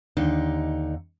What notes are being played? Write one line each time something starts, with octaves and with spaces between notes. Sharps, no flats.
D#2 D3 D#4